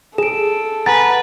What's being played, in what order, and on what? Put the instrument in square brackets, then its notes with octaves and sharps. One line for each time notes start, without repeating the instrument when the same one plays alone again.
[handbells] G#4 [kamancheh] A4 [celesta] D7 E7
[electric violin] B4 [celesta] F#5 G#5 A#5 [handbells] A6